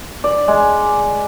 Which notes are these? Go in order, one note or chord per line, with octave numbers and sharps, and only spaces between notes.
D5
G#3